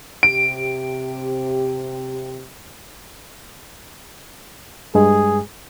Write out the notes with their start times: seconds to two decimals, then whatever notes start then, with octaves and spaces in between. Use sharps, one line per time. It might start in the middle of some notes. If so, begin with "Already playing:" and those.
0.23 C3 G4 D7
4.95 G2 G#3 G#4